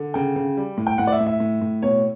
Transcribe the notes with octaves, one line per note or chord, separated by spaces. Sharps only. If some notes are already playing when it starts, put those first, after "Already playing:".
Already playing: D3
C#3 G5
C#3
G3
A2
G5
A2 F#5
D5
E5
A2
E5
A2
A2
B2 C#5